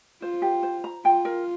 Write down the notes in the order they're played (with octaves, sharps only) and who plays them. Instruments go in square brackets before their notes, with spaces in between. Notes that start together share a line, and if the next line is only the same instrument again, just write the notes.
[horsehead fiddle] F4 [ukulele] C5
[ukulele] G4
C5
A#5
[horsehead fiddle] F4 [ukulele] G5
[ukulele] A#4